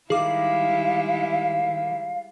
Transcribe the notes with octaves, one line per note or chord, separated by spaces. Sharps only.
D#3 G3 G#3 E4 G#4 F5 D6